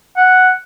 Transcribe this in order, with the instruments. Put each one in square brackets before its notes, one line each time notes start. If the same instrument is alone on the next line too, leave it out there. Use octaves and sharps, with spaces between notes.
[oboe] F#5